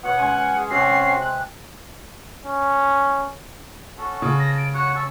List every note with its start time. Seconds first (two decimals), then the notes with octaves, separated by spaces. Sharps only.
0.03 B2 C#5 F#5
0.17 G#3 C#4 G#5
0.56 G#4
0.70 C3 G#3 C4 C#4 F#4 C7
1.20 F#6
2.45 C#4
3.98 C#4 F#4 A4
4.22 C#3
4.39 A5 A#6
4.58 D7
4.74 F#4 C#5 F#5 F#6
4.95 C#4 A5 C#6 E6